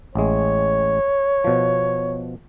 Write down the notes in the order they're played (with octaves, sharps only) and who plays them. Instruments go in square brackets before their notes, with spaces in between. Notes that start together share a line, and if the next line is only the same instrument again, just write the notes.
[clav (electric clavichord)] A1 G#3 [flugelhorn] C#5
[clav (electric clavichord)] B2 F3